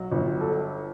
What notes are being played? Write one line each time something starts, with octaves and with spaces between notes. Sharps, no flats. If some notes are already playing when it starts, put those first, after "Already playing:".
Already playing: B1 F#3
G1
A4